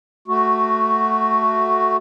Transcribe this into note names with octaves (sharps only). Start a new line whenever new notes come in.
A3 F#4